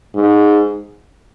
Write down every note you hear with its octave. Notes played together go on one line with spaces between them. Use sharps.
G#2